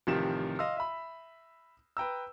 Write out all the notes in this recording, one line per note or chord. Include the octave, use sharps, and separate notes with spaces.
A1 C3 D#3 F3 G4 E7
D#5 F5 C6 E6
E5 B5
B4 G5 A#5 E6